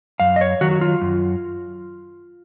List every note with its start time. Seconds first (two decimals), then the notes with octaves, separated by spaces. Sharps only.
0.20 F#2 F5
0.36 D#5
0.41 C#5
0.61 D#3 F#3 F#4
0.71 F#4
0.81 F4
1.01 F#2